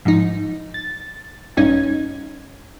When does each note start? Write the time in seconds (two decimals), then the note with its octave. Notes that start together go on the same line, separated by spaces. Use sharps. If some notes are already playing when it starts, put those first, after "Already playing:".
0.05 G#2 F3 D#4
0.74 A6
1.57 A#1 G2 C#4 D#4 G#6